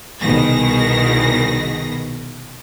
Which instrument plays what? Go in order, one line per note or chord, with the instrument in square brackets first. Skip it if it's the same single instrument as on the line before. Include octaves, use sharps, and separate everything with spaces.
[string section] C2 B2 D#3 G#4 A#6